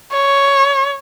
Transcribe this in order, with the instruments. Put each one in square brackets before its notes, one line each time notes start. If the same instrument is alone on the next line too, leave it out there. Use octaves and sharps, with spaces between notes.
[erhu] C#5